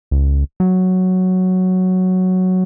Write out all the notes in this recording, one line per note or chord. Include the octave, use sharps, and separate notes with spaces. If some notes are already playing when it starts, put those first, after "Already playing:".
C#2
F#3